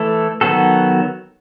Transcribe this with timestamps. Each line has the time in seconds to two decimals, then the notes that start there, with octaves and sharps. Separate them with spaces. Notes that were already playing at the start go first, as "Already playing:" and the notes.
Already playing: E3 A3 E4 A4
0.41 D#3 F#3 B3 F#4 A4